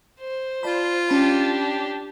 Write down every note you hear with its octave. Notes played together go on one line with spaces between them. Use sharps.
C5
F4 D5 A5 B5
C#4 D4 G4 A5 B5